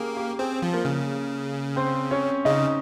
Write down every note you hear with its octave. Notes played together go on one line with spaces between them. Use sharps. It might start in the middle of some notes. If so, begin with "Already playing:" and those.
Already playing: A#3 C#4 G4 G#4
G4
C4 G#4
F3
A#3 A#4
C#3
C4 C5
C#4 C#5
C#3 D#4 D#5